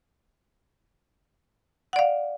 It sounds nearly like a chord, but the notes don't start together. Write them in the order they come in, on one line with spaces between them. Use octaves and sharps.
F#5 D5 F5